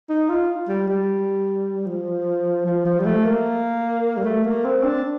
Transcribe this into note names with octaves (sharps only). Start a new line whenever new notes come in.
D#4
F4
G3
G3
F3
F3
F3
G3
A3
A#3
G3
A3
A#3
C4
D4